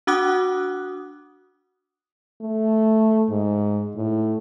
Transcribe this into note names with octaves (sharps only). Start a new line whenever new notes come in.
D4 F#4 F#5 D6 D#6 F#6
A3
G#2
A2